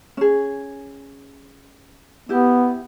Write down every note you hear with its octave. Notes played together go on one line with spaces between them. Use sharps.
C#4 G#4
B3 E4 G4